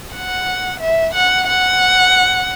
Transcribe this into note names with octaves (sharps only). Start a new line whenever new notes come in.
F#5
E5
F#5
F#5